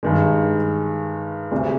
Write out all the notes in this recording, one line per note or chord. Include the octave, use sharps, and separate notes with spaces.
G2 D#3 G#3
D2 C3 G3 D4 G#4